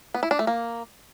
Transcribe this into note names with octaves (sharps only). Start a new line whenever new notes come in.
B3
E4
D4
A3
A#3